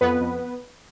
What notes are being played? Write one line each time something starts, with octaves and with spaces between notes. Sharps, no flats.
F2 B3 B4
F2